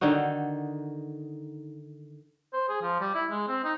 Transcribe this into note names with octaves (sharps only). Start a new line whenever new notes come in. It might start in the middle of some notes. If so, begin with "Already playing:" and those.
D3 D#3 D#4 F#4
C5
G#4
F3
G3
E4
G#3
C4
D#4